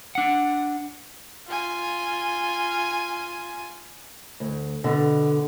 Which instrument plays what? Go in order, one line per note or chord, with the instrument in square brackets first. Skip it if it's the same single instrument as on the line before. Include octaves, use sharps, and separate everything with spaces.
[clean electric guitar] D4 F#5
[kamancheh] F4 G#5
[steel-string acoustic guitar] D2
B2 D3